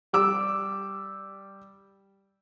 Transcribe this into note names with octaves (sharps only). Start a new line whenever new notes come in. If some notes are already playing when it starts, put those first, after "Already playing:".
G3 D6 E6